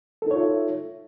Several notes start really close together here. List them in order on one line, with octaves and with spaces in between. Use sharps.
A4 D#4 C#5 F4 E5